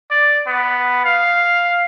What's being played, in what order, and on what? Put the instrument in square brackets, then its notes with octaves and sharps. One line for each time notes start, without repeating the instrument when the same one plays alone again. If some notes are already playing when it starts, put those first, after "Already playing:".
[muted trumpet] D5
B3
F5